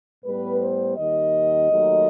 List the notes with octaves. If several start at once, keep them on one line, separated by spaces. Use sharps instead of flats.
A2 G3 B3 B4
C5
D#2 D#3 G3 D#5
D#2 D#3 F#3 A3